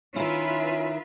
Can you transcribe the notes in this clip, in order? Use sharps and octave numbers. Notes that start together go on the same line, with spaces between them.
D#3 C#4 E4 F4 B4 E5